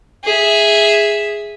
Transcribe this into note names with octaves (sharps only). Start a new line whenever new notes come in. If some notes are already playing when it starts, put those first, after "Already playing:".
G#4 E5